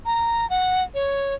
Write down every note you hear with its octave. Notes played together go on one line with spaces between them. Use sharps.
A#5
F#5
C#5